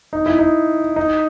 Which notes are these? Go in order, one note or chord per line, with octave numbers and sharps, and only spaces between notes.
D#4
E4
D#4
D#4